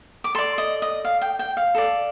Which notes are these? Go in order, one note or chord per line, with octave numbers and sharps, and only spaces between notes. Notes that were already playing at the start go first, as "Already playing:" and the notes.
D6
A4 D5 C6
D#5
D#5
F5
G5
G5
F5
A4 D5